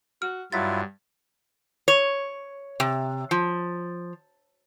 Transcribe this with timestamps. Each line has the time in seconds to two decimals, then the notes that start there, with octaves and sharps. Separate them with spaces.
0.22 F#4 F6
0.52 G2 F#3 E4 F4 A6 B6
1.88 C#5
2.80 C3
3.31 F3